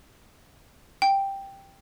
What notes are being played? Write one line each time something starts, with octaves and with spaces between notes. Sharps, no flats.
G5